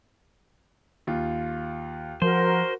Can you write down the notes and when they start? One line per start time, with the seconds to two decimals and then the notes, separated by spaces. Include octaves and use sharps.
1.07 D#2 F4
2.22 F3 F#4 A#4 C5